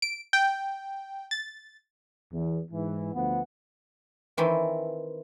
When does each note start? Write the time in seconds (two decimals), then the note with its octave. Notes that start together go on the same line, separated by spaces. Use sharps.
0.02 D7
0.33 G5
1.31 A6
2.33 E2
2.72 G#2 E3
3.14 D2 F3 B3 F#5
4.37 D#3 E3 C4